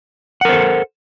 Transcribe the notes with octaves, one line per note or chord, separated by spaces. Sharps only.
A4 A#4 C5 F#5